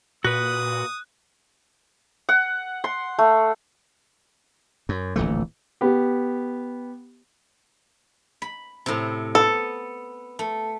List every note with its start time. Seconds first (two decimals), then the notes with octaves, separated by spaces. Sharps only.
0.24 A#2 F#4 B4 D#6 F#6
2.29 F#5
2.84 C6
3.19 A3
4.89 F#2
5.16 D1 A#1 E3 A3
5.81 B3 G4
8.42 B5
8.86 A2 C3
9.35 B3 A4
10.39 A3